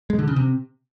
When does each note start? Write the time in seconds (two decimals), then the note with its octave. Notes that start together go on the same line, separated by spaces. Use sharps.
0.10 G#3
0.19 D3
0.27 C#3
0.36 C3